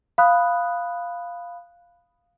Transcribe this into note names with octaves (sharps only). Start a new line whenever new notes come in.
F5 B5 D#6 F#6